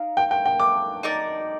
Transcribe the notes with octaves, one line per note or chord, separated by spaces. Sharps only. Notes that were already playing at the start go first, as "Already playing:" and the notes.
Already playing: D#4 A#4 F5
G5
G5
G5
D6
D#4 A#4 D5